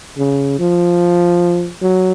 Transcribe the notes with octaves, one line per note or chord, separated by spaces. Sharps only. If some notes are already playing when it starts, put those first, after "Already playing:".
C#3
F3
F#3